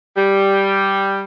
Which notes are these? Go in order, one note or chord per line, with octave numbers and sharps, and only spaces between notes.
G3